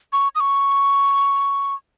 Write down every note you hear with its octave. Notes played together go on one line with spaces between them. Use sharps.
C#6
D#6
C#6